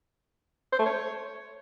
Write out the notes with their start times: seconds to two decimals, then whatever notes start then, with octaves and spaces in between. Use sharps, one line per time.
0.73 C5
0.79 A3
0.86 C#5